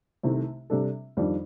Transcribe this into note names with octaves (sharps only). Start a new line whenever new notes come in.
C2 C3 D#3 A3
C3 G3 D4 A4
F2 D#3 G3 D4